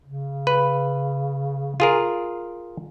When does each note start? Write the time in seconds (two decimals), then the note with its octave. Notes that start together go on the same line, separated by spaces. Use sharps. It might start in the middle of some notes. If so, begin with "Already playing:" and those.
0.05 C#3
0.47 B4
1.80 F4 G#4 A#4